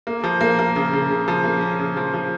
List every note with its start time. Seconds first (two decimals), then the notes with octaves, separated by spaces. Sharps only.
0.07 A#3
0.24 F3
0.41 A#3
0.59 A#3
0.76 C#3
0.93 C#3
1.10 C#3
1.28 F3
1.44 A#3
1.61 C#4
1.79 C#3
1.97 F3
2.13 F3